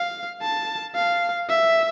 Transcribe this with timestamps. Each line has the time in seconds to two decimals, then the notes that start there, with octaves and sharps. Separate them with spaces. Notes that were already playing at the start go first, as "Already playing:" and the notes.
Already playing: F5
0.41 A5
0.95 F5
1.49 E5